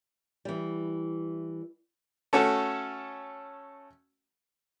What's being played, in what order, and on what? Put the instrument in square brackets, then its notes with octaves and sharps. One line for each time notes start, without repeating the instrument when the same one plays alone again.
[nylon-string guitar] E3 G3
[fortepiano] A3 C#4 F#4 A4